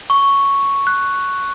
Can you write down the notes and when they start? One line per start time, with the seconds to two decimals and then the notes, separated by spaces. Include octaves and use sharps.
0.10 C#6
0.87 F#6